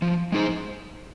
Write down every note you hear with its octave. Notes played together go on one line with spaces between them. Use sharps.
F3
G#3 D#4 G#4 C5